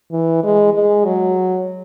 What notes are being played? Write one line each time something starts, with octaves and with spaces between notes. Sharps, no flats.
E3
G#3
G#3
F#3